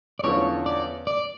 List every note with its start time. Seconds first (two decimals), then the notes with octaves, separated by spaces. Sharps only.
0.19 D5
0.24 E2 D3 F3 C#4 C#5
0.66 D5
1.07 D5